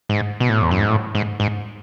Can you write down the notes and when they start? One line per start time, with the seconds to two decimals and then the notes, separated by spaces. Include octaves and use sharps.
0.09 G#2
0.40 B2
0.49 A2
0.62 E2
0.71 F#2
0.79 G#2
0.89 A2
1.15 G#2
1.40 G#2